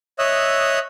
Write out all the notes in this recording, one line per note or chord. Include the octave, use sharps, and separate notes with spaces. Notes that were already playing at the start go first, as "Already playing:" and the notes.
C#5 D#5 E5 D#6 E6 F#6